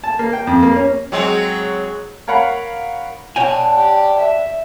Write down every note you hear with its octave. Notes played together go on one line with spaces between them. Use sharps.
A5
A#3
G5
F2
A#3
C#4
F#3 G#3 C4
A#4 C#5 F5 F#5 B5
B2 D4 C#5 G5 G#5
G4
E5